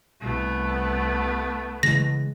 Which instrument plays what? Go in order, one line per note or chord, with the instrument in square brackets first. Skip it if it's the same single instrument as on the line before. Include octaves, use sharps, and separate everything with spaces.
[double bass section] C2 [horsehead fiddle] A3 B3
[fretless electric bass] C#3 E3 G#3 [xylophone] A#6